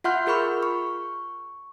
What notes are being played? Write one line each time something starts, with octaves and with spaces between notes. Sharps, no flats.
F4 E5 F#5 C6 F6 G6
F4 G#4 A#4 B5 C#6 F6
C#6